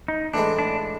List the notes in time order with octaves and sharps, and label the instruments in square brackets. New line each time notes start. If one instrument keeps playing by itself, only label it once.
[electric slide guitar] D#4
[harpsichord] A2 E3 G#3 [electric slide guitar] D4
[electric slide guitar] D4